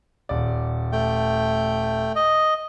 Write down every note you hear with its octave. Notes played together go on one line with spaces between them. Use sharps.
D#1 D5
A3 G5
D#5